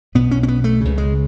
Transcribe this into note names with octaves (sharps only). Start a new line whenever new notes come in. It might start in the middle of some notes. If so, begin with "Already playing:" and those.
B1 B2 B3
C#4
C#4
B3
A3
C#2 C#3
G#3